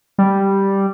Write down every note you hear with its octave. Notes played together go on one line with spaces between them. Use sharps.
G3